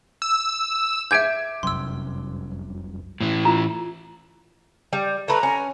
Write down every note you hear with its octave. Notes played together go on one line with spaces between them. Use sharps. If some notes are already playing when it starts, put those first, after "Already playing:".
E6
E5 D6 G6 G#6 D7
F1 C2 F#2 C6 E6
A2 E3
F4 A#5
G3
A3 B4 A#5
C#4